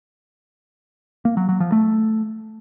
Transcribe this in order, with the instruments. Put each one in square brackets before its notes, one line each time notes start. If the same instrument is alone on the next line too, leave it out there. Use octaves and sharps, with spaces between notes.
[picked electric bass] A#3
F#3
F#3
F3
A3